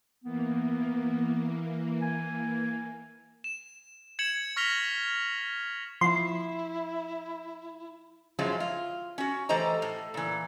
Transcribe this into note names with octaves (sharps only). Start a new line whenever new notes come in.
E3 A#3 B3
G#5
E7
G#6 C#7 E7 F#7
C#6 F6 A#6 B6 F7 G7
F3 E4 C6
F#2 F3 F#3 G#3 E4 F4
F4
C#4 F#4
E3 A3 G4 C5 D#5 A#5
A2
A#2 E3